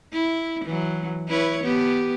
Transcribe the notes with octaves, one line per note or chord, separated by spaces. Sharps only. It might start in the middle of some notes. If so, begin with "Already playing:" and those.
E4
E3 F#3
E4 B4 C#5
B3 G4